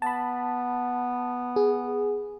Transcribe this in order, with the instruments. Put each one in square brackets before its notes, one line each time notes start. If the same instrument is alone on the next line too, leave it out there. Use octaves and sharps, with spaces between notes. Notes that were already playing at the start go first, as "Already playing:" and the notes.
[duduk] B3 [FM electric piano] A5 B5
[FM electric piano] G#4